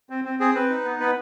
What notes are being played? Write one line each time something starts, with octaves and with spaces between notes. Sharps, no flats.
C4
C4
C4 G#4
C4 B4
D#4
B3
B3 B4